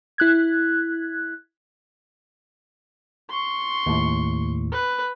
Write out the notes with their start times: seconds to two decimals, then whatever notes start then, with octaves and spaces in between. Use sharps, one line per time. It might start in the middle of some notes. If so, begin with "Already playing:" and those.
0.18 E4 F#6 G#6
3.29 C6 C#6
3.86 D#2 A2
4.72 B4